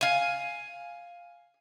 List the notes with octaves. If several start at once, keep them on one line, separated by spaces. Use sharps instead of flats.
F5 G#5